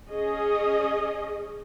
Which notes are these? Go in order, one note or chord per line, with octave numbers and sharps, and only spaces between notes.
C#4 G#4 D#5